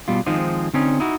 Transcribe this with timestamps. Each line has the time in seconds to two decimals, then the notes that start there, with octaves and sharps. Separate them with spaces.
0.08 B2 G3 F4
0.26 D#3 F3 G#3 C4 D#4
0.74 D3 C4 C#4 D#4
1.00 D#4 E4 F#4